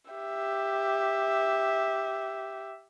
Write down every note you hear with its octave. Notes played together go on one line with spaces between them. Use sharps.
G4 E5